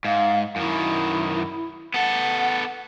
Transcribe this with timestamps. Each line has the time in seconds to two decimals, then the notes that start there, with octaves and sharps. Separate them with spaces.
0.05 G#2 F5
0.56 F#2 D#3 E4
1.94 B3 A4 F#5